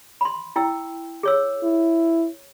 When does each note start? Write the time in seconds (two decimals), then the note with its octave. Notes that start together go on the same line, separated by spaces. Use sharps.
0.21 B5 C6
0.56 E4 G5 E6
1.23 G#4 C#5 E6
1.63 E4